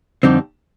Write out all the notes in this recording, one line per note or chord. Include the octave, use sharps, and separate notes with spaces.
F2 D3 G3 C4 D#4